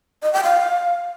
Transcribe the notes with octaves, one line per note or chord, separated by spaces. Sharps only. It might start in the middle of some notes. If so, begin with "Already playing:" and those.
D#5
G5
F5